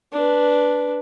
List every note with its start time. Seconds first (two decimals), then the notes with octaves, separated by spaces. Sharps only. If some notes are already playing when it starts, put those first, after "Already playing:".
0.12 D4 B4